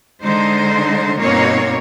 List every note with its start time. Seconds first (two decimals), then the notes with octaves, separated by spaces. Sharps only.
0.25 D3 G#3 D#4 C5
1.20 G2 B2 A#3 C4 D#4 C#5